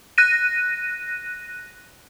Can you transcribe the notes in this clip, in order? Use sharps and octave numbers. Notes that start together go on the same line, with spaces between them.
F#6 A#6 D#7